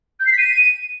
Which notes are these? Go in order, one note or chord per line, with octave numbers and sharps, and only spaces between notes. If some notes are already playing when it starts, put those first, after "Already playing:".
G6
C7
B6
D#7